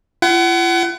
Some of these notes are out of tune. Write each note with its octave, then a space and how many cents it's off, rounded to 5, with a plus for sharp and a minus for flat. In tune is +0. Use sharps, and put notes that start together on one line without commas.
F4 -45 F#5 +30